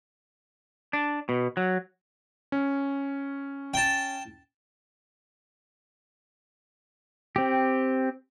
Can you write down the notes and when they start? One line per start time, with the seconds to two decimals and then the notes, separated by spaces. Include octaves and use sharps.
0.93 D4
1.29 B2
1.57 F#3
2.52 C#4
3.74 G5 A5
7.36 C4 G4